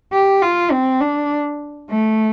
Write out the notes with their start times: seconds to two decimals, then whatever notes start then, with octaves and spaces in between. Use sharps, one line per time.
0.13 G4
0.42 F4
0.72 C4
1.01 D4
1.90 A3